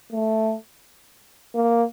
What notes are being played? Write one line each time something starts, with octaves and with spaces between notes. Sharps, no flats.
A3
A#3